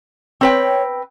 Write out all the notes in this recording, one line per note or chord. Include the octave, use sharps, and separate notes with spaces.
C4 B4 C#5 G5